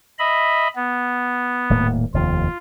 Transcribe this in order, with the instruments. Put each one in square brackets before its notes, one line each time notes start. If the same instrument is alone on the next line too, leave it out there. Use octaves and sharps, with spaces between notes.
[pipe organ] D#5 E5 B5
B3
[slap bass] D#1 A2 A#3
[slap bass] F1 D#2 [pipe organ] F4